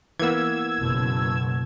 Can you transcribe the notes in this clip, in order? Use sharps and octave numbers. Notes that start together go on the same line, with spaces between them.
E3 A#3 B3 E6 G#6
F#1 B2